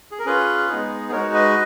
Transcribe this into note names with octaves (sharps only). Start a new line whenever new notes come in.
G#4
A#4
C#4 F4 G#4 B4
G#3 B3 D#4 G#4
G#3 D#4 F#4 A#4 C#5
B4 D#5